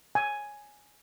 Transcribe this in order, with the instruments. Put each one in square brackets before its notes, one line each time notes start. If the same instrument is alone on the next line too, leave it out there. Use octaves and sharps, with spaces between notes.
[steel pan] G#5